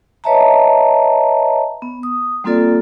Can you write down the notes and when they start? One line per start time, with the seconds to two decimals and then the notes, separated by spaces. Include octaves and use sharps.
0.24 B4 C#5 D#5 E5 A5 A#5
1.82 B3
2.03 D#6
2.44 G3 A#3 C4 F4 A4 D5